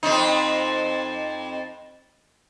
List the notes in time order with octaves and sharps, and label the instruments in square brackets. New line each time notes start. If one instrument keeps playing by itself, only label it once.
[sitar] F2 C4 D#4